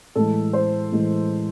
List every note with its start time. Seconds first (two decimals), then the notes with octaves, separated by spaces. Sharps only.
0.15 A2 E3 G#3 A4
0.53 C5
0.92 A2 E3 G#3